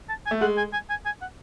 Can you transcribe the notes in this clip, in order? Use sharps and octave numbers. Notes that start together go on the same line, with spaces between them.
A5
G#5
A3
G#3 F#5
G#5
G#5
G#5
G#5
F#5